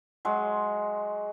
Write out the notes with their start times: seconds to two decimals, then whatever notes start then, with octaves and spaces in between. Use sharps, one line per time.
0.25 F#3 G#3